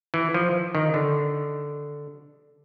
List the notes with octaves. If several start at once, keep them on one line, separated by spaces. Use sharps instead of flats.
E3
F3
D#3
D3